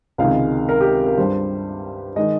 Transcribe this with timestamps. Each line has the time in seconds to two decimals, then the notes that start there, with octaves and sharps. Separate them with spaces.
0.18 C#2 C3 D#3 G#3 F5
0.69 A#4
0.81 G4
1.05 A#4
1.18 G2 G3 C5
2.16 D#3 G#3 D#5